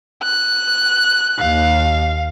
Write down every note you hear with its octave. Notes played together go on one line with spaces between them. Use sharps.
F#6
D#2 F5